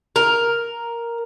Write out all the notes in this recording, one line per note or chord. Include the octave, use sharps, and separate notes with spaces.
A#4